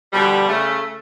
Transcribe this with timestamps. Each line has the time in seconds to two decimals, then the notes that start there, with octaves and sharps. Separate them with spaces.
0.13 B2 D3 F3 G3
0.48 C#3 A3